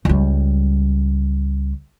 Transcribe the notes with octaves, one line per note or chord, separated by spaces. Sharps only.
C#2 G3